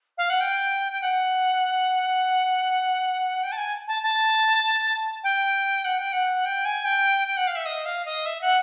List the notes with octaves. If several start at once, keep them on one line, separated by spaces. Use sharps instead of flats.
F5
F#5
G5
G5
F#5
G5
A5
G#5
A5
A5
G5
F#5
G5
F#5
G5
G#5
G5
G5
F#5
F5
E5
D#5
F5
D#5
E5
F#5